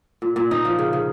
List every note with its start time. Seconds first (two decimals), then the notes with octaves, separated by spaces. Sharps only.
0.22 A#2
0.36 A#2
0.51 D#4
0.65 F3
0.79 C#3
0.93 C#3